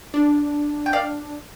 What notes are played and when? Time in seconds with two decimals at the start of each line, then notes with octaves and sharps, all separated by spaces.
0.14 D4
0.86 G5
0.93 D5 F5